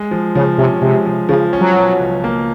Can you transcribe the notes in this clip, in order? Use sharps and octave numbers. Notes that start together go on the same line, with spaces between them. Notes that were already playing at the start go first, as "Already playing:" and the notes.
Already playing: G#3
F3
C#3 F3
C3 C#4
C3 G#3
F3
C#3 F3
C#4
F#3
B2
C#2
A#3